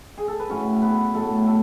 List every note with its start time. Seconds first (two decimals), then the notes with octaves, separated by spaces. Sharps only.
0.18 G#4
0.28 A4
0.39 B4
0.49 A2 F#3 C#4 C#5
0.82 B3 B4
1.14 A2 F#3 A3 A4
1.46 A3 A4